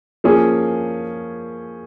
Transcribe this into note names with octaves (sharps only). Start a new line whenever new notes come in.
F3 A#3 C#4 G#4